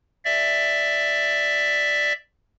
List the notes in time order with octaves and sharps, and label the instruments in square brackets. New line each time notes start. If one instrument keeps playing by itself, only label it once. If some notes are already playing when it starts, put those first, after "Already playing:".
[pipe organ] D5 E5